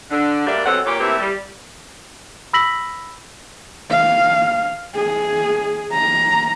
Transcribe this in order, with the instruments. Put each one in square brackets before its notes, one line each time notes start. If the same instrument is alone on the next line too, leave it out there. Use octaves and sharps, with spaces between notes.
[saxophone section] D3 D4
D2 G3 A#3 D4 D5 E5
F#2 B2 C4 C#4 A4 F#5
A#2 G4 C#5
A3 A#3 C4 E4 G4 B4
G3
[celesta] B5 E6 A#6 B6 F#7
[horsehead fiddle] F5
G#4
A#5